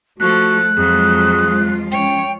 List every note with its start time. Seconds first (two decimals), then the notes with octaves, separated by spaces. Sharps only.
0.20 F3 A3 F#4 A4 F#6
0.77 F2 F3 F#3 G#3 F4 G#4
1.91 C#4 C#5 G5